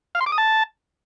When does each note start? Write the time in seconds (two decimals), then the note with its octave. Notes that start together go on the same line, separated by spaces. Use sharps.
0.15 F5
0.21 C6
0.26 D6
0.32 D#6
0.38 A5